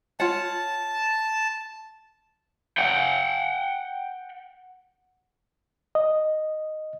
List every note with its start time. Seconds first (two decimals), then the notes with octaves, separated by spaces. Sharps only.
0.20 F4 C#5 F#5 A5
2.78 F#5 G5
5.95 D#5